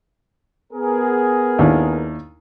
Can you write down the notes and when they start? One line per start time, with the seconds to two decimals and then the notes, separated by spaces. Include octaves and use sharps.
0.73 B3 G#4 A#4
1.59 D#2 D4 E4